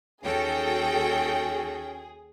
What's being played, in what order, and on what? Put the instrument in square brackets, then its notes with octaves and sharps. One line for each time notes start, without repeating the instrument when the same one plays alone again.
[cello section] D#2 F#4 A4 [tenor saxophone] C#4 [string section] G#4 [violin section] G5